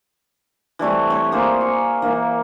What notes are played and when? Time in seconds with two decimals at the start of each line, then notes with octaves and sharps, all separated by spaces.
0.79 E3 G3 A3 C4
1.10 C4 C#5
1.32 A#3 G#4 C5 G#5
1.61 C#6
2.02 E3 A#3